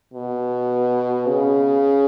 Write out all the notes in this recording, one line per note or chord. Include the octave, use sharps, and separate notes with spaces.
B2
C#3